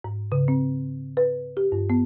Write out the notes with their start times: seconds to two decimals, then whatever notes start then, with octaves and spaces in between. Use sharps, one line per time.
0.04 G#2
0.32 C#3
0.48 C4
1.17 B4
1.57 G4
1.72 G2
1.90 B3